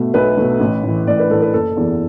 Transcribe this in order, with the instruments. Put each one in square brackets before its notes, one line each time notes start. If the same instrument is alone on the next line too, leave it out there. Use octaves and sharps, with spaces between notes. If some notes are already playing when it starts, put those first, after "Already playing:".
Already playing: [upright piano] B2 A3 E5
B1 B4
B2 A3
A1
A2 E3
A1 D5
B4
A2 E3 A4
B4
F#1 A4
E2 E3 B3